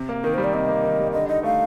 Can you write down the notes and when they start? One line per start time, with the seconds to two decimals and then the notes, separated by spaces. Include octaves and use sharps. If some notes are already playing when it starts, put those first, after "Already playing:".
Already playing: C3
0.09 A#3
0.24 D#3 A#4
0.34 G3 C5
0.44 D5
0.53 C3 D#5
0.69 A#3
0.83 D#3
0.99 G3
1.13 D3 D#5
1.29 D#4 D#5
1.43 A3 F5